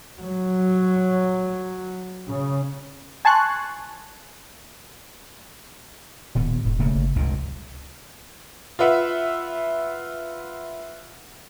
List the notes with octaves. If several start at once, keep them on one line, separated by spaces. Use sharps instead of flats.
F#3
C#3
G#5 A5 C6 C#6 F#6
D1 A#2 D#3 B3
E1 G#2
C#3 A3 A#3
G1
F1 C#2 G2 A#2
F4 B4 E5 F#5